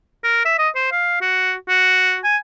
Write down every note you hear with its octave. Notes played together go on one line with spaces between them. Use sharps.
A#4
E5
D#5
C5
F5
F#4
F#4
G#5